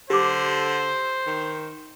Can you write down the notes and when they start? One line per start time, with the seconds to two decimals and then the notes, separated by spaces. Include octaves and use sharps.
0.10 D3 G4 C5 D6
1.27 D#3